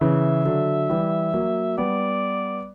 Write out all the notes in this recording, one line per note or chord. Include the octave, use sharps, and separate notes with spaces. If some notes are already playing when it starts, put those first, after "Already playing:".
C#3 E3 E5
D3 F#3
E3 G3
F#3 A#3
G3 B3 D5